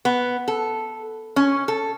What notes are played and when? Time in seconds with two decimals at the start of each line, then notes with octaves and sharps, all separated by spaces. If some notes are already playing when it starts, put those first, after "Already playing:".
0.05 B3
0.48 A4
1.36 C#4
1.68 A4